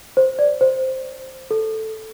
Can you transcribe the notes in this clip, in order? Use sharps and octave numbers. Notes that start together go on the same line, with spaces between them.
C5
D5
C5
A4